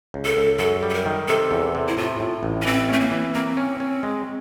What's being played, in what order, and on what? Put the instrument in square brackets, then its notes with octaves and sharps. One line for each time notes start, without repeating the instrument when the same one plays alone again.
[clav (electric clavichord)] C#2
[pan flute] A4
[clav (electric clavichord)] C#2
[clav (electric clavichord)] F#2 [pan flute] A4
[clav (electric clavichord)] G3
[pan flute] A4
A#4
[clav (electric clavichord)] D#3
[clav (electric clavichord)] C3 [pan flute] A4
[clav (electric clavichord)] E2
C3
[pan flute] E4
[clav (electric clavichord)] A2 [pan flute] F4
[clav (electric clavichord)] A2
A1
[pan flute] C#4
[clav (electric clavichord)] E3 [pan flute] C4
[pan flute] A3 [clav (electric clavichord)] C#4
[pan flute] A#3
[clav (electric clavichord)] E3
[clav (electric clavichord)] A#3 [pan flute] C4
[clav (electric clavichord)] C#4
C#4
G#3